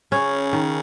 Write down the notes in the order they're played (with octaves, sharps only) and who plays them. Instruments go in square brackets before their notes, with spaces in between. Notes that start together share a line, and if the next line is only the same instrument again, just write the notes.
[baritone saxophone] C#3 [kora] C#4
[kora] D#3